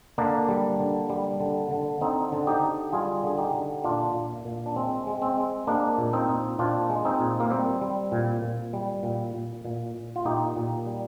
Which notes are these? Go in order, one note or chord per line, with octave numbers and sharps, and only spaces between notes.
D3 A#3 D4
G3
D3
G3
D3
D3
D3 C4 D#4
D3
D#4 G4
D3
G3 F4 G#4
D3 G#4
D#4 G4
D3
A#2 D4 F4
A#2
A#2
D4
G#3 C4
G#3
C4
G#3
G#3 A#3 D4
A#2
C4 D#4
A#2
A#2 D4 F4
G#3
C4 D#4
A#2
A#3
G3 C4
G3
A#2
A#2
G3
A#2
A#2
A#2
A#2
F4
A#2 D#4 G4
A#2
G3